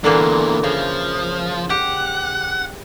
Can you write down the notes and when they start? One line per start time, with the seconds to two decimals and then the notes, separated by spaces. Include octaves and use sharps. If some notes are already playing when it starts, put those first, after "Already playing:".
0.04 E2 A#2 D3 E3 A#3
0.64 C#3 F3
1.70 G4 F#5